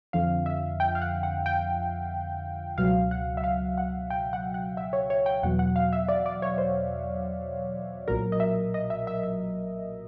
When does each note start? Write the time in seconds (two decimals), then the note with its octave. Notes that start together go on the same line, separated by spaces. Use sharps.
0.13 F2 D3 F3 F5
0.46 E5
0.80 G5
0.95 F5
1.02 F#5
1.23 F#5
1.46 G5
2.78 C#2 B2 F#3 F5
3.11 F#5
3.37 E5
3.44 F5
3.78 F#5
4.10 G5
4.33 F#5
4.54 F#5
4.77 E5
4.93 C#5
5.10 C#5
5.26 G5
5.43 E2 B2 F#3 F#5
5.59 F#5
5.76 F5
5.93 E5
6.08 D5
6.26 D5
6.42 C#5
6.58 C5
8.08 B1 A#2 F#3 A#4
8.32 D#5
8.40 E5
8.74 D#5
8.90 E5
9.07 E5
9.23 E5